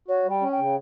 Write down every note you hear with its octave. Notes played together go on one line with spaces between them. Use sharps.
F#4 C#5
G3
G5
C#4
G5
C#3